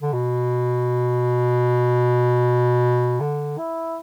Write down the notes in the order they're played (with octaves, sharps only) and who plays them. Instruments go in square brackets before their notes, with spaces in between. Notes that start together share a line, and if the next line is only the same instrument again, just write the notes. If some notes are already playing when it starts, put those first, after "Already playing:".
[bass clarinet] D3
B2
D3
E4